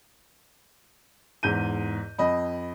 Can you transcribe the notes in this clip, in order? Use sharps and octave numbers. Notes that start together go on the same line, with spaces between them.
E2 G#2 G6 D#7
F2 D#5 B5